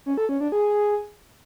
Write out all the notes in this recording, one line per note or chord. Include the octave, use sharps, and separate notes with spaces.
C#4
A4
C#4
D4
G#4